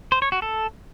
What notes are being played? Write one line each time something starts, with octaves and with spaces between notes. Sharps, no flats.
C5
C#5
F#4
A4